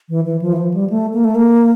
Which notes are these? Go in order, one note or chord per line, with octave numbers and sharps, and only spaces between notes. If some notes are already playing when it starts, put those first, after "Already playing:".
E3
E3
F3
E3
F3
G3
A3
A#3
A3
A#3